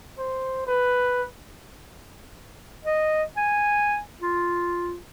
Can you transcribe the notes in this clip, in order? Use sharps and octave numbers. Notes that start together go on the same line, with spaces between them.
C5
B4
D#5
G#5
F4